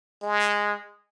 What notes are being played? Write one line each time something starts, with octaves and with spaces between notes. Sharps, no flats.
G#3